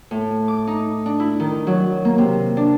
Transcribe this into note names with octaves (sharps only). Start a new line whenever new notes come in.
A2
D6
D#4
D4
E4
D#3
F#3
A#3
C3
D4